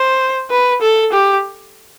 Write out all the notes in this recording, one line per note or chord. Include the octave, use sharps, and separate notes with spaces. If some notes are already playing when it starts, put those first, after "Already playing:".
Already playing: C5
B4
A4
G4